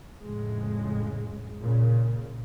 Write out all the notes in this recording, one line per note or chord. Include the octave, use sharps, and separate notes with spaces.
F2 A2 C#3 G#3
A#2 C#3